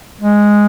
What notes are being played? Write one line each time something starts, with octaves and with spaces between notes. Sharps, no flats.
G#3